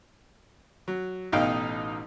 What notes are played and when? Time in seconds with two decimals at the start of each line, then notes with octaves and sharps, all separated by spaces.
0.88 F#3
1.32 A1 B2 D#4 D#5 F5 G5